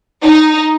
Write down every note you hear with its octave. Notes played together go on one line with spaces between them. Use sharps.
D#4